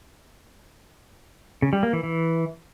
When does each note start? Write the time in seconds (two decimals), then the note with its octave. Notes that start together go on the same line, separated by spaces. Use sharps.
1.62 C#3
1.73 G3
1.83 A#3
1.93 E3
2.03 E3